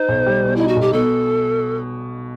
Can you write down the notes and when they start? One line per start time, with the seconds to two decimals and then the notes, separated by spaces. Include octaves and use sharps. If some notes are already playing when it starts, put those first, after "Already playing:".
Already playing: D#4 C5
0.09 B1
0.26 G3
0.43 B2
0.56 D#4 E4
0.68 F#4
0.76 B1 G4
0.93 B2 A4